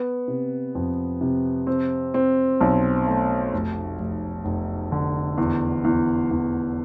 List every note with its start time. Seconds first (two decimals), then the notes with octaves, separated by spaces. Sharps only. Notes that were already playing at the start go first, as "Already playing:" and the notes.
Already playing: B3
0.28 C3
0.75 F2
1.21 C3
1.67 C4
2.14 C4
2.61 B1
3.07 A3
3.53 F1
3.99 F1
4.45 F1
4.92 D3
5.37 E2
5.84 E2
6.31 E2